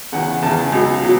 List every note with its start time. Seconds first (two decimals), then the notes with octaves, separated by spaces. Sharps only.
0.12 E2 C#3 E3 F#5
0.42 E2 C#3 E3 A5
0.72 C#2 B2 F#3
1.03 B2 F#3